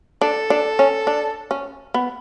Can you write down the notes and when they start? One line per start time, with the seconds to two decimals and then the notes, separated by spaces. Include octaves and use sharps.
0.21 D4 A4
0.50 D4
0.79 C#4
1.07 D4
1.51 C#4
1.94 B3